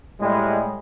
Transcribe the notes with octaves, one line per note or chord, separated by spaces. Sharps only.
A2 G3 G#3